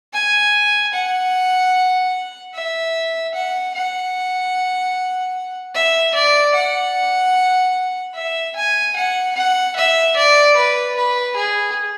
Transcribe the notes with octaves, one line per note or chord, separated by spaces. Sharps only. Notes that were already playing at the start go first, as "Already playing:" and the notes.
G#5
F#5
E5
F#5
F#5
E5
D5
F#5
E5
G#5
F#5
F#5
E5
D5
B4
B4
G#4